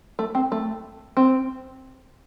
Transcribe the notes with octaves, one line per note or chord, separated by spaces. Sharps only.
A3
C4
A3
C4